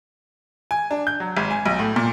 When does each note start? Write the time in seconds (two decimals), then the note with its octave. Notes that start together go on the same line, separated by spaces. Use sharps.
0.71 G#5
0.91 D4
1.07 G6
1.20 F#3
1.37 G#1
1.51 G#5
1.66 B1
1.79 A2
1.96 A#2